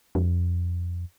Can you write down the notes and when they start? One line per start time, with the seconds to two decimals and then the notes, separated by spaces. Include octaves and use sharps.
0.15 F2